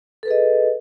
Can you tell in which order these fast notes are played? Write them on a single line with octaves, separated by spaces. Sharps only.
A4 B4 G#4 D#5